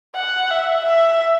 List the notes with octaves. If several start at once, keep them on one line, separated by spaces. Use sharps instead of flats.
F#5
E5
E5